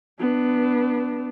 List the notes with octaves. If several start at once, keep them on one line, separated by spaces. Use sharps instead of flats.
B3 D4